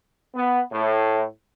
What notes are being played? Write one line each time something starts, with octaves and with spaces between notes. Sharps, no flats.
B3
A2